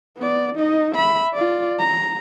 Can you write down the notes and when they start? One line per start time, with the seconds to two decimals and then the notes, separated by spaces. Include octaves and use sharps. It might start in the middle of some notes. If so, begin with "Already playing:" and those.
0.17 B3 D5
0.55 D#4 D#5
0.94 E5 B5
1.34 F4 D5
1.79 A#5